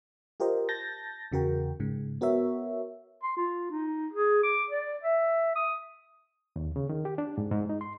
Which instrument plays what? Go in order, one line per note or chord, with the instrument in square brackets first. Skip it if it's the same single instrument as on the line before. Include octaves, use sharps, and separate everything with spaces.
[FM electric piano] F4 G4 A#4 C5 D#5
A5 G6 A6 A#6
E2 C#3 F#4 A#4 G5
G#2 C#3
B3 F#4 A#4 C#5 E5
[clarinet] C6
F4
D#4
G#4
D6
D5
E5
D#6
[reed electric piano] D#2
C#3
D#3
G4
D4
G#2
G#2
D#4
C6